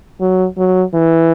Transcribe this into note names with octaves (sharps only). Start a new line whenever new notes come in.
F#3
F#3
E3